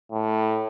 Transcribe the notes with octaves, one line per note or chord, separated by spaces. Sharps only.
A2